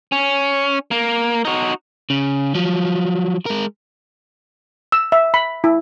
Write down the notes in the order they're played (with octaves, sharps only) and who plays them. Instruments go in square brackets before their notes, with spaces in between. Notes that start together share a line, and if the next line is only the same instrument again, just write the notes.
[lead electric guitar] C#4
A#3
D#4 F#4
[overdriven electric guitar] C#3
F3 F#3
G#3 A#4
[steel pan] E6
E5
B5
E4